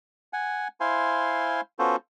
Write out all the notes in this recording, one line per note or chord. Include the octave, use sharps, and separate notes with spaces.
F#5 G#5
E4 C5 F5 G#5 C6
B3 C#4 F4 F#4 A4 C5